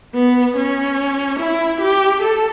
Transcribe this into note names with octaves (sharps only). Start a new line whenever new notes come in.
B3
C#4
E4
G4
A4